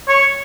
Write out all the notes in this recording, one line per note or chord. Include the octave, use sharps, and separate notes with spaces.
C#5